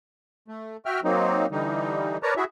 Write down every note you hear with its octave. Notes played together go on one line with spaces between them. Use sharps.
A3
F#4 E5 G5 F6
F#3 A#3 C4 D#4
D3 E3 G3 D#4
A#4 B4 C#5 D5 A5 A#5
E4 F#4 G#4 E5